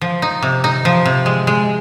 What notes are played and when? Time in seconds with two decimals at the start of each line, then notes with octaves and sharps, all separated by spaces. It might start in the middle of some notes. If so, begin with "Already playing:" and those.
0.01 F3
0.22 D#4
0.43 C3
0.64 D#4
0.85 F3
1.05 C3
1.26 G#3
1.47 G#3